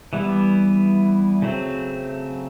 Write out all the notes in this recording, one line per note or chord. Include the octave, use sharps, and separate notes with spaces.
E3 G3 B3 E4
C#3 F#3 A3 C4